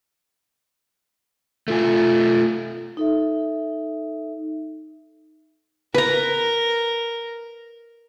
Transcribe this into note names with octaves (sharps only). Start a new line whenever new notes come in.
A3 F4 G#5
D#4 A4 E5
A#4 B4 A#5